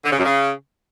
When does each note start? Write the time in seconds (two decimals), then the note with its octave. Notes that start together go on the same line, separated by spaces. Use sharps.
0.04 D3
0.11 C#3
0.18 F#2
0.25 C#3